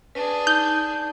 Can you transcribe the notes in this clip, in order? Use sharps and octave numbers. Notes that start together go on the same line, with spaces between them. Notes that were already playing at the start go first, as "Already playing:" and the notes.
D4 G#4 B4
D#4 G6